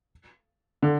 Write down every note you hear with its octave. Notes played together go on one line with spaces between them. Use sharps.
D3